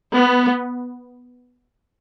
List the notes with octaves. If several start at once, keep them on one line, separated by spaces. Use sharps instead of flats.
B3